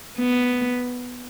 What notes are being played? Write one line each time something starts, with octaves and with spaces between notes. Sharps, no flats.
B3